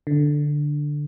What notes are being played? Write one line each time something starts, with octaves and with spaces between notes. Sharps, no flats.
D3